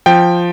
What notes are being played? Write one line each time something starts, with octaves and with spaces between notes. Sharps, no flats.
F3 G5